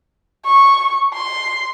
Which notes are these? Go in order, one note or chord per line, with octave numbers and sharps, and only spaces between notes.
C#6
C6